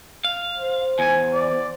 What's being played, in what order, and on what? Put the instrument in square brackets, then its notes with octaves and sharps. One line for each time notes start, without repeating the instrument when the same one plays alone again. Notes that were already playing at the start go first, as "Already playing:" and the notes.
[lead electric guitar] F5
[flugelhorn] C5
[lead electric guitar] E2 [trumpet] G#5
[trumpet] D5